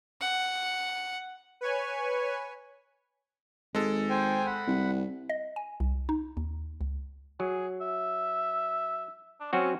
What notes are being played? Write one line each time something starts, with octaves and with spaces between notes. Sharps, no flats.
F#5
B4 C#5 G#5
G#1 G#3 A4
C5 G5 G#5
F#5 B5
C2
D#5
G#5
C2
D#4
D#2
C#2
F#3 G#4
E5
D4
F#3 C4 C#4 F#4